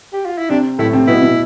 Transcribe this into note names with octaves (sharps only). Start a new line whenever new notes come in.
G4
F4
E4
C3 C4 D4
A2 A3 E4
C3 C4
B2 B3 E4
B2 B3